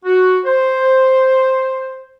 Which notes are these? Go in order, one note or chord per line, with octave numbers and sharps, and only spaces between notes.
F#4
C5